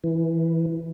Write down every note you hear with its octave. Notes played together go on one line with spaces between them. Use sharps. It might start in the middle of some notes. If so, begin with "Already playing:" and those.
E3